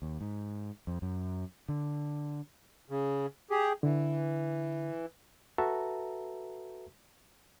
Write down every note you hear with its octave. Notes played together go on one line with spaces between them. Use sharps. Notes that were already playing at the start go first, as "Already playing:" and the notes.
D#2
G#2
F2
F#2
D3
C#3
G4 G#4
D3 E3
F#4 A4 B4 E5 A5 A#5